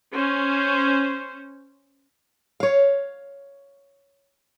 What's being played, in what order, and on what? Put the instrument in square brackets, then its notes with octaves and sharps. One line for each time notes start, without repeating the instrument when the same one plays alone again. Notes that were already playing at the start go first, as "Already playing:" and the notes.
[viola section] C#4 C5
[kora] C#5 F5